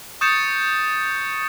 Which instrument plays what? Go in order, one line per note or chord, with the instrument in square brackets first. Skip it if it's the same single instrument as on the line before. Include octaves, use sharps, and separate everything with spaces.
[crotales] C#6 D#6 G6 A6 C#7 E7